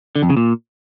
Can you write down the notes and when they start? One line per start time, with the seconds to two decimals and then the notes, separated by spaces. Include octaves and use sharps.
0.16 D3
0.23 F2
0.30 C#3
0.37 A#2